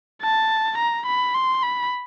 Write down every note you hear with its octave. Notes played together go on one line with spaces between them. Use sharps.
A5
A#5
B5
C6
B5